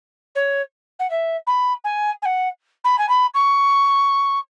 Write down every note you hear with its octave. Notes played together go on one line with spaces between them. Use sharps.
C#5
F#5
E5
B5
G#5
G#5
F#5
B5
G#5
B5
C#6